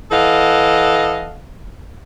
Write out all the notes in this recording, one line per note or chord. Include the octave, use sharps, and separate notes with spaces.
E3 A4 D#5 F5 F#5